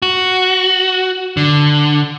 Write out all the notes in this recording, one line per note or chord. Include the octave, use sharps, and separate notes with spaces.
F#4
D3